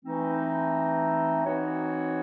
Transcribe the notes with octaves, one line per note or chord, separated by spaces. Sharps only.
E3 A3 C4 D#4
E3 C4 D#4 F#4 C#5